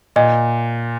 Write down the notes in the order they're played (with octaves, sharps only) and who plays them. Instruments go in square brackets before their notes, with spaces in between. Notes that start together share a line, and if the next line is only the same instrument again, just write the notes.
[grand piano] A#2 [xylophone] D#5